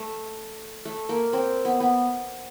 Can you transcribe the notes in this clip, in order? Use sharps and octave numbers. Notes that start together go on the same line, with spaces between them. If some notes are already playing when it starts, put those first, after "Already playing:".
Already playing: A3
A3
A#3
C4
B3
B3